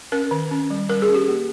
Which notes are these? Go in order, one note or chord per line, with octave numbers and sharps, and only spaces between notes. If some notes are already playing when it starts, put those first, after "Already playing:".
C#4 A#4
D#3
C#4
G3
G3 A#4
G#4
C#4
G4
A#3